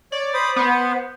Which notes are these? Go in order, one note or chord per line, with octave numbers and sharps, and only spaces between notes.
C#5 D5
C5 B5 D#6
B3 C5